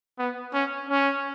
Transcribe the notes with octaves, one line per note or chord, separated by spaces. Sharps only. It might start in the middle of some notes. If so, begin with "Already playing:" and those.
B3
C#4
C#4